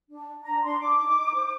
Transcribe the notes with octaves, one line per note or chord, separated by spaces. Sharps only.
D4
D4
D4 A#5
D4 C6
D4 D6
D#4
D#4
C5